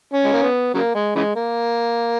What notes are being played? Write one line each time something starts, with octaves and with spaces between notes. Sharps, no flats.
C#4
G#3
A#3
B3
C#3 F#3 A#3
G#3
C#3 E3 G#3
A#3